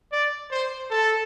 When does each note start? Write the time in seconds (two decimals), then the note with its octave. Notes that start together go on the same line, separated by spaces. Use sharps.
0.12 D5
0.51 C5
0.90 A4